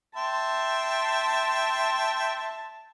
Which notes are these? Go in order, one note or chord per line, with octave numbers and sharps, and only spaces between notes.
E5 G5 A5 C6